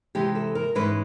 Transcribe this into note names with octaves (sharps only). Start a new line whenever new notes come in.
C3 E3 G#3 G4
A4
A#4
G#2 E3 G#3 C#4 B4